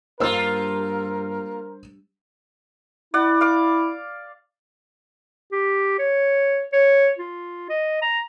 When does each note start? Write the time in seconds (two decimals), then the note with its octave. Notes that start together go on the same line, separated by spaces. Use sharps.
0.20 G2 A#3 F4 A#4 C5 E6
3.14 E4 D5 F#5
3.41 F5 D6
5.52 G4
5.99 C#5
6.73 C#5
7.19 F4
7.69 D#5
8.02 A#5